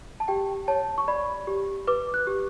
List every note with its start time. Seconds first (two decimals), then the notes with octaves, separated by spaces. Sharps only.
0.20 A5
0.28 G4 G5
0.68 C#5 A5
0.98 C#6
1.08 D5 B5
1.47 G4
1.87 B4 D6
2.14 F#6
2.27 G4